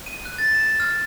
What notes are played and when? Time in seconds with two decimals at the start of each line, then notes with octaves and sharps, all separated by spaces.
0.06 D#7
0.25 F#6
0.38 A6
0.54 E7
0.80 F6